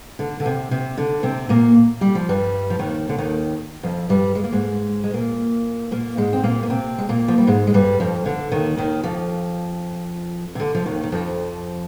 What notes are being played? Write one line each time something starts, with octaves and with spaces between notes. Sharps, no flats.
D3
D3
C3
C3
D3
C3 C4
A#2 A#3
G3
F3
G2 G3
F3
D#2 D#3
D3
D#2 D#3
F2 F3
G2 G3
G#3
A#3
G#2 G#3
G#3
A#2 A#3
A#2 A#3
G#2 G#3
C4
A#2 A#3
A#3
C3 C4
G#3
A#2 A#3
F3
G3
G#2 G#3
G#3
G2 G3
F2 F3
D3
D#2 D#3
D#2 D#3
F2 F3
C3
D3
F3
D#2 D#3
D#3
F2 F3